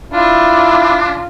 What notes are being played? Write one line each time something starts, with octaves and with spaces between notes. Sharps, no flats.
D4 E4 F4